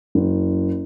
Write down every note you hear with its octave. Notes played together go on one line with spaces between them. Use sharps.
F#1